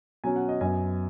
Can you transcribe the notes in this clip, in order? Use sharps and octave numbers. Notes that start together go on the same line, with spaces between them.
B2 F#3 C#4 G#5
F#5
D#5
F#2 F#3 B3 G#5